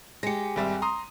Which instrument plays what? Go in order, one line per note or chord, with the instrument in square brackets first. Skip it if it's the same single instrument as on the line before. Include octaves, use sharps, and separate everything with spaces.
[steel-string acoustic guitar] G#3 G4 [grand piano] A#6 C#7
[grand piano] G#1 G3 E5
A#5 C6 D#6